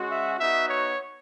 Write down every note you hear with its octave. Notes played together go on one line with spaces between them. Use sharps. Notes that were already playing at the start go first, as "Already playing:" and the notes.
Already playing: G#3 C#4 F#4
E5
B3 D#4 F#4 E5
C#5